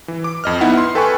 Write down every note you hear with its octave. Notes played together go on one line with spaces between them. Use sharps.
E3
D6
F2 D#5 F6
B3 D#4 E4 F#5
C6
A4 B4 G5 G#5 B5 C#6